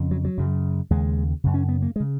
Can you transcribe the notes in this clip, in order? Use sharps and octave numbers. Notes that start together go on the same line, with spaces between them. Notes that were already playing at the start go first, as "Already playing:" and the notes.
Already playing: F2 C#3
F#3
F#3
F#2 C#3
D#2 C#3 G#3
F#2 C#3
C#4
B3
A#3
G#3
C#3